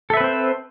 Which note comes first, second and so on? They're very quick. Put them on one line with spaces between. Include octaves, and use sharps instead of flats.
A4 E5 B4 C4 C5